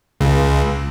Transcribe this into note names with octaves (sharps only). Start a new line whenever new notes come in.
C#2